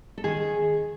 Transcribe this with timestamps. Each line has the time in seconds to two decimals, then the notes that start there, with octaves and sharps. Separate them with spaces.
0.18 A4
0.24 D#3 G#4